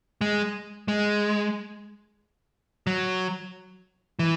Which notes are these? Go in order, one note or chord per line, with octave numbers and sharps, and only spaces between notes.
G#3
G#3
F#3
E3